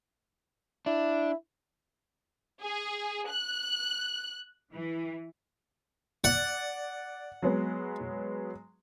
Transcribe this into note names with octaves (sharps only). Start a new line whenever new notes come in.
D4 E4
G#4
F#6
E3
D5 F#5
F#3 G#3 B3